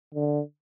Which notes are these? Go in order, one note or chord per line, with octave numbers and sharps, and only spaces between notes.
D3